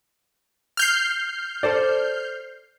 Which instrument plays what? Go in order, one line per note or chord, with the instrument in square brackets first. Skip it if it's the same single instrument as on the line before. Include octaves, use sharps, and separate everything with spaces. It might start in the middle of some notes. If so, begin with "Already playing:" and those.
[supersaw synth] F6 G6 C7
[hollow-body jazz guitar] A4 C5 D5